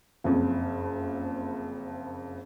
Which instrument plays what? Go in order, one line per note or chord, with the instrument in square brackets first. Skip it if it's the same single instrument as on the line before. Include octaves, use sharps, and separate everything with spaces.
[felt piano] F#1 F2